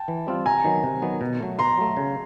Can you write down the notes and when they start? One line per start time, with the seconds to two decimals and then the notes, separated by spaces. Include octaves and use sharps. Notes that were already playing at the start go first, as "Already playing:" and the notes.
Already playing: G5 A5
0.08 E3
0.27 G3 C4 F4
0.46 C3 G#5 A#5
0.64 D#3 F#3 B3
0.84 C3
1.02 D#3 F#3 B3
1.21 B2
1.40 F#3 A3
1.59 B2 A#5 C6
1.78 F#3 A3
1.97 C#3